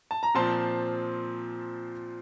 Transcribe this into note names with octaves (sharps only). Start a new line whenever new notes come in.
A5
A#5
A#2 F3 C4 A5 C6